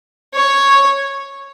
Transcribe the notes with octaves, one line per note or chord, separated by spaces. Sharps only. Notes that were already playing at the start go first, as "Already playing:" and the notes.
C#5